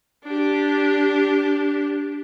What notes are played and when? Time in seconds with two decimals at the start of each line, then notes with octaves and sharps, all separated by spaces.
0.25 D4 G4